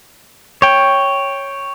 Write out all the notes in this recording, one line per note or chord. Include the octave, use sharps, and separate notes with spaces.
C#5 G5